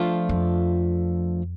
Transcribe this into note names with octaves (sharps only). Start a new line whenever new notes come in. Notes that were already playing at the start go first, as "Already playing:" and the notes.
Already playing: F3 A3 D4 F4
F2